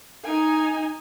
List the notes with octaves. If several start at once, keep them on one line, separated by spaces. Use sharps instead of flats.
D#4 G#5